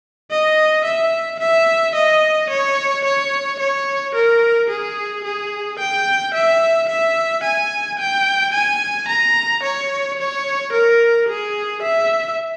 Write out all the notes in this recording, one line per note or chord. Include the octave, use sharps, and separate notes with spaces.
D#5
E5
E5
D#5
C#5
C#5
C#5
A#4
G#4
G#4
G5
E5
E5
G#5
G5
G#5
A#5
C#5
C#5
A#4
G#4
E5